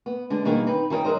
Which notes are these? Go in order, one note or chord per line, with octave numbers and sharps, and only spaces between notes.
B3
D3 G#3 D4
B2 D#3 G3 A#3 D#4 G#4
C4 D#4 B4
D#3 G#4 A4 D#5 G5
F#3 G#4 A#4 C5 D#5